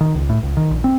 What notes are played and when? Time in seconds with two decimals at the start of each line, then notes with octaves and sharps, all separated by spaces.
0.01 D#3
0.15 C#2
0.30 A2
0.43 C#2
0.57 D#3
0.71 A#1
0.84 C4